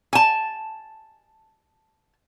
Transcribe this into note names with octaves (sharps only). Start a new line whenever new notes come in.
G#5 A5